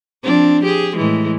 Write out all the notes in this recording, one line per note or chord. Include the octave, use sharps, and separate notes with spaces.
F3 C4 D4
G4 G#4
A2 E3 G#3